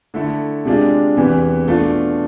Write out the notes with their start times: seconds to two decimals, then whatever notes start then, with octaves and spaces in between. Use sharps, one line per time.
0.14 D3 A3 E4
0.65 C3 G#3 D4 F4
1.17 E2 C3 E3
1.68 B2 A3 D4 F4